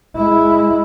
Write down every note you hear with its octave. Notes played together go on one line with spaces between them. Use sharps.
G#3 E4